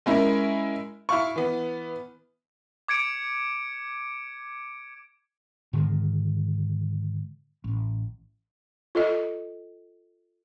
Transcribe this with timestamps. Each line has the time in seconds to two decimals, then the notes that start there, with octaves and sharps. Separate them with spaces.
0.06 G#3 C#4 E4 A#4
1.09 E4 F5 C#6
1.36 E3 B3
2.88 D6 G#6 C#7 D7
5.73 G#2 D3 D#3 G#3
7.64 A1
8.95 F4 A4 D#5